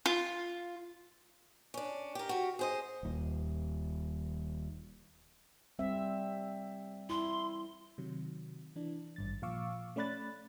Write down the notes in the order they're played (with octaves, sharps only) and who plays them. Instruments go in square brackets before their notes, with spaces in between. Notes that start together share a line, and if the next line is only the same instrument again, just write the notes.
[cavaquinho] F4
[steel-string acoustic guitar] C#4 D4
G4 A#4
F#4 G4
G#4 C5 D#5
[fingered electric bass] D#1 D#2
[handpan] G3 C4 E5
[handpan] E4 [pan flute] C6
[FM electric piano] C3 D#3 F#3
E3 D4
G#1 G2 A6
A#2 F3 F5 C#6 D6 E6
A3 C#4 D5 B5 F#6 A6